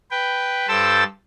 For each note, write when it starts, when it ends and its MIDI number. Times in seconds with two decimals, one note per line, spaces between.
0.11 0.68 71
0.11 0.68 79
0.68 1.03 43
0.68 1.03 69
0.68 1.03 72
0.68 1.03 79
0.68 1.03 81
0.68 1.03 88